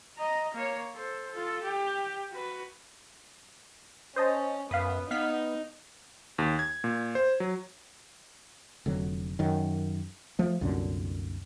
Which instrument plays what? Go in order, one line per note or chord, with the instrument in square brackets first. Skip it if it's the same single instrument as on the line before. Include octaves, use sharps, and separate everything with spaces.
[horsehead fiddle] D#5 A#5
A#3 C#5
A4 C5
F4 A4
G4
F#4 B4
[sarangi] C#4 [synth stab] C5 D#5 A5
[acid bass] F#2 [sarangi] B3 [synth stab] F5 B5 D#6
[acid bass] B3 [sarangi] D#4 [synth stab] F5 F6 B6
[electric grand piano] D#2
G#6
A#2
C5
F#3
[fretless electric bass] F1 D3 F#3
F#2 D#3
F3 A3
C2 F#2 A#2 D3